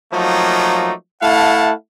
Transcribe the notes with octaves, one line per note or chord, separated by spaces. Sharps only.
F3 F#3 A3 A#3 D#4
A3 E4 F5 F#5 A5